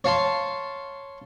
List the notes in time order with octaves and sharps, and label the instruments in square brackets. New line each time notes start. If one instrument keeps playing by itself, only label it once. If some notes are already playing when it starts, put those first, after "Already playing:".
[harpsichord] C#5 F5 A5 C6